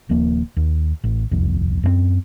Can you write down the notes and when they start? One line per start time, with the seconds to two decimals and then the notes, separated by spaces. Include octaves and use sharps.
0.09 D#1 D#2 F3 A#3
0.57 D#2
1.04 A1
1.31 D#1 C2 F2
1.83 F#2 D#3 C4